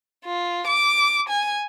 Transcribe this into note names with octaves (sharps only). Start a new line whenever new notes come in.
F4
D6
G#5